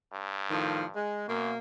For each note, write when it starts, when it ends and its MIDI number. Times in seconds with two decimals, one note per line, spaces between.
0.13 0.96 43
0.50 0.84 45
0.50 0.84 51
0.50 0.84 53
0.95 1.26 56
1.28 1.52 42
1.28 1.58 47
1.28 1.58 58